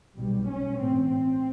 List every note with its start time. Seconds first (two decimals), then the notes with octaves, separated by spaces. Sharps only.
0.18 B1 B2 G3
0.48 C#4
0.78 A1 A2 C4
1.09 C4